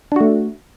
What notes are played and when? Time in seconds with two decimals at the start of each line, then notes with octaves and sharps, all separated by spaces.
0.12 D4
0.16 F#4
0.21 A3